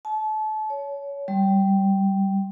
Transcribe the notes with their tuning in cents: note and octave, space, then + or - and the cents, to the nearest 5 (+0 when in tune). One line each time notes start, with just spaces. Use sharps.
A5 -30
C#5 +20
G3 -10